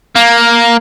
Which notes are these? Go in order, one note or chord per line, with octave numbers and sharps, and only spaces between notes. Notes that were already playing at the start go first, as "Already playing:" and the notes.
A#3